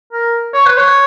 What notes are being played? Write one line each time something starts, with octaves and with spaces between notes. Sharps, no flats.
A#4
C#5
B4
C#5